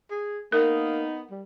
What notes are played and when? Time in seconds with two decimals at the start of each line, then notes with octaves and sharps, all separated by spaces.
0.11 G#4
0.52 A#3 B3 D#4 A#4
1.31 G3